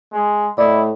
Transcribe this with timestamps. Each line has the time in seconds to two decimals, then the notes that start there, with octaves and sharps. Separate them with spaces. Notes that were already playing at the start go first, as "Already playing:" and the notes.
0.13 G#3
0.58 A2 E4 D5 D#5